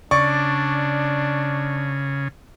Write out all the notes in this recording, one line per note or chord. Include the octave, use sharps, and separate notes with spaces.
C#3 D4 D5 C#6